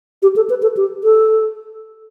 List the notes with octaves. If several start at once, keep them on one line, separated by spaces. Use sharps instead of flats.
G4
A4
B4
A4
G4
A4